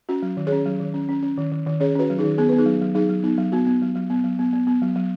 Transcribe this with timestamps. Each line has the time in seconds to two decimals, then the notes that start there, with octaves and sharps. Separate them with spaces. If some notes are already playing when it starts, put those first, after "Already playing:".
0.09 C#4 F#4
0.23 F#3
0.37 D#3
0.47 G#4 C#5
0.52 C#4
0.66 F#3
0.80 D#3
0.94 C#4
1.09 C#4
1.23 C#4
1.38 D#3
1.52 D#3
1.66 D#3
1.80 C#4 G#4 C#5
1.96 C#4 F#4 B4
2.10 F#3
2.18 D#4 G#4
2.23 D#3
2.38 B3 G#4
2.49 B3 B4
2.58 D#4 G#4
2.66 F#3
2.81 F#3
2.95 F#3 D#4 G#4
3.09 F#3
3.23 B3 D#4
3.38 F#3
3.52 B3 F#4
3.67 B3
3.82 F#3
3.96 F#3
4.10 B3
4.24 F#3
4.39 B3
4.53 B3
4.67 B3
4.82 F#3
4.96 F#3